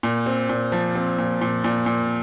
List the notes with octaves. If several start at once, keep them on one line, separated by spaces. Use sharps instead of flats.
A#2
C4
A#2
F3
C4
A#2
A#2
A#2
A#2